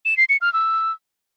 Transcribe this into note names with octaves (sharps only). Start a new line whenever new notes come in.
E7
C7
C#7
F6
E6